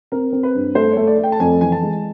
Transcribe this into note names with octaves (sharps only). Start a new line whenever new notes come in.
C4 A#4
C4
B4
G2
A3 C5
C#5
A3
D5
A3 G5
A5
F2 G#5
E3 G#5
A5
G#3